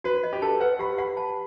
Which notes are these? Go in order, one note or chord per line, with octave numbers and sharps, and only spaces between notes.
F#4 B4
D#5
G4
A4 A5
B4 F#5
G4 B5
F#5 B5
A5